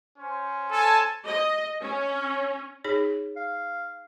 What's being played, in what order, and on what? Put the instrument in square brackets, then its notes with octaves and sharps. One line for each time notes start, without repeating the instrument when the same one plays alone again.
[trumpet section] C#4 C5
[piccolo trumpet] A4 [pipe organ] G#5 A5
[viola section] D#5
C#4
[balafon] D#4 G#4 C#5
[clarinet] F5